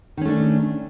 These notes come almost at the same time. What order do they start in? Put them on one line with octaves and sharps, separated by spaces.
D#3 C#4 A3 D4